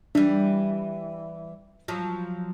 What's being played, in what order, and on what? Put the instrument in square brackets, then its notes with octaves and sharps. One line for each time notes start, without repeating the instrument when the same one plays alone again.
[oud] E3 G3 [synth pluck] D4
[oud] F3 F#3